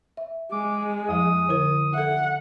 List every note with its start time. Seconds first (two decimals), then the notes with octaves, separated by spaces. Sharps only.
0.17 E5
0.52 G#3 D6
1.09 F2 F3 D#6
1.49 D3 E4 A#4
1.94 A4 E5 F#5